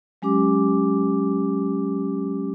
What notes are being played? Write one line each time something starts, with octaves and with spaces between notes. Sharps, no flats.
F#3 G#3 C#4 G4 D6